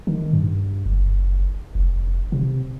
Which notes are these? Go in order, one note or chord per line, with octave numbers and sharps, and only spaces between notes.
D#3
G2
F#1
F1
C3